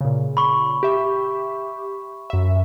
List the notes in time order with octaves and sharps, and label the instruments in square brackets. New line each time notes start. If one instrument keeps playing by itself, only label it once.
[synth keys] A#2 C#3
[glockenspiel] B5 C#6
[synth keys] G4 E5
F#2 E5